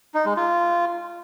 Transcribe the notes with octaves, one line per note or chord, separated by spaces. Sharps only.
D#4
G#3
F4